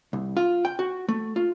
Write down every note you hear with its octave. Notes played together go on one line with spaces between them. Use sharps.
C2
F4
G5
F#4
A3
F4